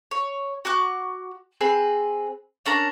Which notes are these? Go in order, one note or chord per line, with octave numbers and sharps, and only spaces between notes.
C#5
F#4 C#6 D6 F#6
C4 G#4 B4
C#4 D4 A#4 A#5